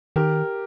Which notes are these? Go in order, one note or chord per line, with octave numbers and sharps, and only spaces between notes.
D#3 G4 A#4